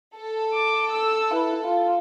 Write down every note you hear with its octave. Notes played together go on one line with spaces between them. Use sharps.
A4
D6
E6
E4 B4
F4